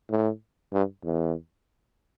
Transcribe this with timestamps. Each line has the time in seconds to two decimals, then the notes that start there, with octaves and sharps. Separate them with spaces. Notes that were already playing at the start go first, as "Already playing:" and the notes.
0.10 A2
0.73 G2
1.05 E2